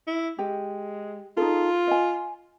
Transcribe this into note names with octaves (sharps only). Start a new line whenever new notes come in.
E4
G#3 G4
D#4 F4 G#4 A4
D#5 G#5